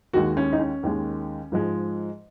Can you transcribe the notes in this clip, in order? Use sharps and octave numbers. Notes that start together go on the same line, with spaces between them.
D#2 D#3 G#3 F#4
C#4
D#4
C#4
D#2 D#3 G#3
G#2 F3 G#3